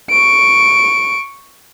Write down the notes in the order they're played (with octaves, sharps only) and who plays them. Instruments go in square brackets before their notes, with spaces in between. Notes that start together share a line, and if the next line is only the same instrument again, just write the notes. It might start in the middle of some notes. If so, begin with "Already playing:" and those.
[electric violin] C#6 D7